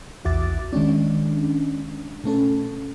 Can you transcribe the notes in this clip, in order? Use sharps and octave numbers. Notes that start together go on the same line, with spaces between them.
A#1 E2 F#4 E5 D6 A6
D#3 G#3 C#4 D4
B2 A3 C#4 A4